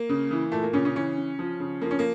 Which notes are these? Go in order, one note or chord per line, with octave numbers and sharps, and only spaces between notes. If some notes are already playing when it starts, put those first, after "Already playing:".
Already playing: A#3
C#3
E3
A#2 A3
A#3
A#2 C#3 C#4
C#3 C#4
C#3 E3 C#4
C#3
F3
C#3
F3 A#3
C#4
A#3